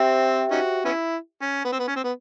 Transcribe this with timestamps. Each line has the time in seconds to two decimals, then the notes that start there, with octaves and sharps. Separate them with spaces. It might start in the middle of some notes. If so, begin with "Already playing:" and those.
Already playing: C4 G4 C5 E5 G5
0.51 C#4 D#4 F#4
0.85 B3 C#4 E4
1.42 C#4
1.65 B3
1.72 C4
1.79 B3
1.88 C#4
1.96 C4
2.04 B3